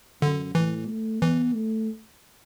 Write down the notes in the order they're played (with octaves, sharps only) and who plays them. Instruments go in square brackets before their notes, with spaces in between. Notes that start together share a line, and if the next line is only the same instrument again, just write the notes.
[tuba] F#2 [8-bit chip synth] D3
[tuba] A2 [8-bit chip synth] E3
[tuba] A3
[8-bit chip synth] E3 [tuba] B3
[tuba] A3